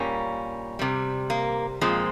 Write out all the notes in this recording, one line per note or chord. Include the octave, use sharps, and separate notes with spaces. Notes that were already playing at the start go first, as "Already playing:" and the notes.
Already playing: A#2 G3 A#3 C#4
C3 G3
A#3
A#2 F3 G#3 C4